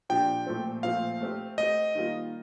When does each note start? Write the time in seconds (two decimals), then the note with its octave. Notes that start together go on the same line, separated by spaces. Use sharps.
0.09 A#2 F3 A#3 D4 G4 G5
0.46 A#2 F3 A3 C4
0.83 A#2 F3 A3 C4 F5
1.21 A3 C4 G4 C5
1.58 A3 C4 G4 C5 D#5
1.95 D#3 G3 A#3 F4